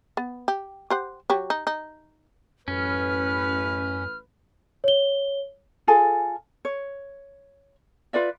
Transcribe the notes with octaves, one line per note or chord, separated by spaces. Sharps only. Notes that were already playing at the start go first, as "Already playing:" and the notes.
B3
G4
G4 C5 F#5
F#3 G4 C#5
D#4
D#4
A1 F#2 C#4 B4 F6
C#5 G7
F4 G#4 A4 G#5
C#5
F4 B4 D5 E5